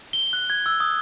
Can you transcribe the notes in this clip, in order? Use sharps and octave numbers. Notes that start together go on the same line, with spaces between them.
G7
F#6
G#6
E6
D#6